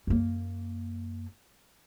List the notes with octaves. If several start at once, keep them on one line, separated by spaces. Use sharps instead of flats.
F#2 A#3